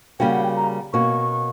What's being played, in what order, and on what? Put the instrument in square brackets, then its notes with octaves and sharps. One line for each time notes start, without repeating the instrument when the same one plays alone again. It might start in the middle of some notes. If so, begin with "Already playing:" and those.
[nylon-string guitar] C#3 G3 A#3 C#4 F#4 [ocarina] G5
[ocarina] F#5
G5
A#5
[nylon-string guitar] B2 A#3 C#4 F#4 [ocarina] C#6